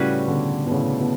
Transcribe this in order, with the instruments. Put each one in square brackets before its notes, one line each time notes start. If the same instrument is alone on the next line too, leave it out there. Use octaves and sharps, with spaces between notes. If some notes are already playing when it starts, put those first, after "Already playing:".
Already playing: [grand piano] A2 C#3 [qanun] G3 C#4 F#4 B4
[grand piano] B2 D3
B2
A2 C#3
B2